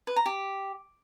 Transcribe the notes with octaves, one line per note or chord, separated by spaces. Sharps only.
B4
A#5
G4